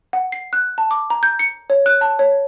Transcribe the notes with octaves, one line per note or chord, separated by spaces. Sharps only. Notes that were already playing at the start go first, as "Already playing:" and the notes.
F#5
C7
F#6
A5
D6
A#5
G6
C#7
C#5
F#6
A5
C#5